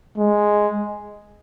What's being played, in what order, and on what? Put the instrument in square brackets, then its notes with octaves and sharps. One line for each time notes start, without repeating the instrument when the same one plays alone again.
[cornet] G#3